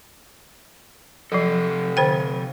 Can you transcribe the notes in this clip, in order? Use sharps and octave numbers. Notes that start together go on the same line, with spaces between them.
C3 F3 F#3 A4
D3 C5 G5